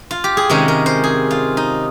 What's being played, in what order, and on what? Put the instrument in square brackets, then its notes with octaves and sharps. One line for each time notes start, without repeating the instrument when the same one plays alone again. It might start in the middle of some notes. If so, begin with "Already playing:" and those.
Already playing: [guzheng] D#4
F4
G4
G#4
C3 D#3 G#3 C#4 A#4
A#4
C5
G#4
F4
D#4